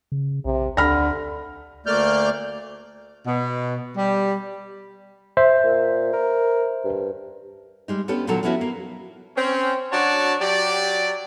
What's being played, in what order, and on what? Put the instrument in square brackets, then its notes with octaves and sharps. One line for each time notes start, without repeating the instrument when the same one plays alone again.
[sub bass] C#3
[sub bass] B1 [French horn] C3
[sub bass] D2 [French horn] D3 [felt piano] B5 F6 A#6
[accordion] D2 A3 A#3 D5 F6 G6
[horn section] B2
G3
[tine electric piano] C5 E5
[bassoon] A#2
A#4
G2
[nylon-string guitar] G3 G#3 D#4
B3 C#4 D4 G4 A4
A#2 D3 D#3 F#3 A4
F3 B3 C#4 E4 F#4
A#3
[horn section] C4 C#4
F#3 D4 F#4 C#5 D5 A5
F#3 G4 D5